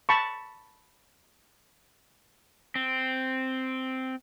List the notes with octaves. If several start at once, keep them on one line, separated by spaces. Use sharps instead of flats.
A5 B5 C#6
C4